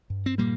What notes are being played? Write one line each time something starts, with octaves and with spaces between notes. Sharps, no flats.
G2
C4
A#2 G3 A#3